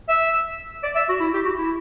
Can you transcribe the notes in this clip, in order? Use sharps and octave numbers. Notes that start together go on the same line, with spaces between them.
E5
D5
E5
F#4
E4
G4
F#4
E4